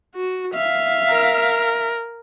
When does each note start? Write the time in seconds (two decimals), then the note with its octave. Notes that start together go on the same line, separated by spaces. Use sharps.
0.15 F#4
0.55 E5 F5
1.10 A#4